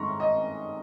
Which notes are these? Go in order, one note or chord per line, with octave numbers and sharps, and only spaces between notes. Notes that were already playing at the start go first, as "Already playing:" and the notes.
Already playing: G#2 D#3 G3 A#5 C6 C#6
D#5